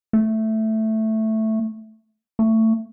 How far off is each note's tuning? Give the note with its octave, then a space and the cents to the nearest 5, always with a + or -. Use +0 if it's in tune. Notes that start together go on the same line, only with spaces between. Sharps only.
A3 +0
A3 +20